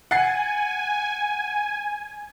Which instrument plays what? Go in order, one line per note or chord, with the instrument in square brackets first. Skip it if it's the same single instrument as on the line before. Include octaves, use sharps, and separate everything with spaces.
[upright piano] F#5 A6 C7 [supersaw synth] G#5